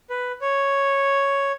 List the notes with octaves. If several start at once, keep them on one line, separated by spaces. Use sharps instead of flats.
B4
C#5